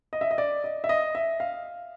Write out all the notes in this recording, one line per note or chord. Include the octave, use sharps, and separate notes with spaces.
D#5
E5
D#5
D5
D#5
E5
D#5
E5
F5